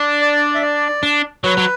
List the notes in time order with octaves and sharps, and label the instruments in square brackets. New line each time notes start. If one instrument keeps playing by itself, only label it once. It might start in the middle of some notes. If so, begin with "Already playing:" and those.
Already playing: [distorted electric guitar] D4
[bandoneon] D5
E5
D5
[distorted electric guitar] D4
[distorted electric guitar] F#3 [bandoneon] B4
[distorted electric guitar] F#3